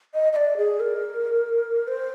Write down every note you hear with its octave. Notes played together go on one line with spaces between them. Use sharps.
D#5
D#5
D5
G#4
A#4
C5